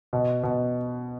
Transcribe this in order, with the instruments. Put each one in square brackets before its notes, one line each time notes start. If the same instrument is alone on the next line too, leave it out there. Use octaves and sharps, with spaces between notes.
[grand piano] B2
B2